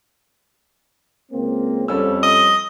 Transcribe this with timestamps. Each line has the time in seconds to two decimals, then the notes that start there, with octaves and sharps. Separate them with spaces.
1.32 C#2 A#3 C4
1.88 F2 G3 C#4 E6
2.23 D#5